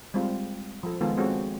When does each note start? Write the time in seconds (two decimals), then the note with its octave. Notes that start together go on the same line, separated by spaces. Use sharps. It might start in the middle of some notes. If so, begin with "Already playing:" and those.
0.14 G3 G#3 C4 F4
0.83 F3 A4
1.01 D#3 G#3 B3 F4 G#4 A4
1.17 G#3 C4 C#4 F#4 A4